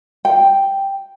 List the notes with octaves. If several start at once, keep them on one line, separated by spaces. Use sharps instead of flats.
G5